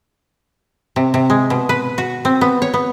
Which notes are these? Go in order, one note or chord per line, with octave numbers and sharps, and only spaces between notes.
C3
C3
G#3
B2
B4
F#4
C4
B3
C#5
B3